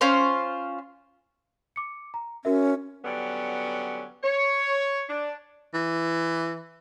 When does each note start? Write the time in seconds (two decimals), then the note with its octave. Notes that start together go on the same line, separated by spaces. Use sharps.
0.01 C#4 F4 C5
1.76 D6 C#7
2.14 A#5
2.45 C#4 F#4 A#4 E5
3.04 D3 F#3 G3 B3 C#4
4.24 C#5
5.09 D4
5.74 E3